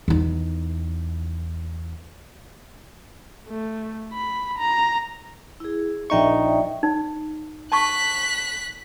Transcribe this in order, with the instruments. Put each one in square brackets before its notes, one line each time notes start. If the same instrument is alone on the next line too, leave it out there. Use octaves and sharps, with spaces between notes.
[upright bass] E2 D#4
[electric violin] A3
B5
A#5
[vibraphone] E4 G#4
[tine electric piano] A#1 D#4 C#6 [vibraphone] D5 E5 G5
[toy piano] D#4
[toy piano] A5 C#6 [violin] F#6 B6